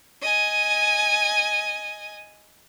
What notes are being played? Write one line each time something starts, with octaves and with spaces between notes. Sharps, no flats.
D#5 G#5